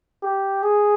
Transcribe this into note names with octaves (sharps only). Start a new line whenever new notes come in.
G4
G#4